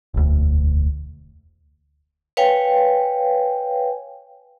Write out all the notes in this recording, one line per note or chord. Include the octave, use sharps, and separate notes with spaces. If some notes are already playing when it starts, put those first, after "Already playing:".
E1 D2
B4 C#5 F5 G5 G#5